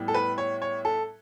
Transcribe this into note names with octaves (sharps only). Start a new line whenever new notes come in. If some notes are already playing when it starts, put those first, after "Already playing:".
Already playing: A2 G3 B3
A4
B4
C#5
C#5
A4